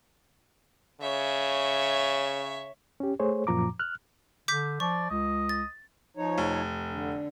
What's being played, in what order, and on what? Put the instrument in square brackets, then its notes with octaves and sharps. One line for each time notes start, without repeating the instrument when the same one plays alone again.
[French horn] C#3 [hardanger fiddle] C#5 E5
[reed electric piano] C#4 G4
A3 G#4 C5 C#5
F#2 A#2 F3 A#5 D6
F6 F#6
[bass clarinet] D3 [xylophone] D6 G6 B6
[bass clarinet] F3 [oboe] D5 [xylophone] C#6
[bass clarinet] C#2 [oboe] D#5
[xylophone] A6
[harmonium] F3 D#4 C#5
[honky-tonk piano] F1
[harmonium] D3